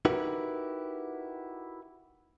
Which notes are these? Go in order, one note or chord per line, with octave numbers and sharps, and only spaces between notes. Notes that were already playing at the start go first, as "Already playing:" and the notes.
D#4 E4 F#4 G4 A#4 B4